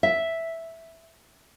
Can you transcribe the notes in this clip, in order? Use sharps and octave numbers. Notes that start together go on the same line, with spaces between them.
E5